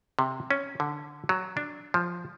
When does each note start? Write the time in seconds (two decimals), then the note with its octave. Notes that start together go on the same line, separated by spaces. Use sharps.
0.19 C3
0.51 C#4
0.80 D3
1.29 F#3
1.57 D4
1.94 F3